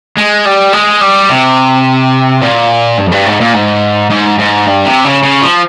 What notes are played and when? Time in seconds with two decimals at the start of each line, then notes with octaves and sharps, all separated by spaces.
0.17 G#3
0.45 G3
0.73 G#3
1.01 G3
1.30 C3
2.42 A#2
2.98 G2
3.07 F2
3.12 G2
3.26 G#2
3.40 A#2
3.54 G#2
4.11 G#2
4.39 G#2
4.67 G2
4.85 C3
5.05 C#3
5.23 C#3
5.42 F3